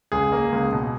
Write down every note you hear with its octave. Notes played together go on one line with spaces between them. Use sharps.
C#2 G#4
A#3
C#2
B2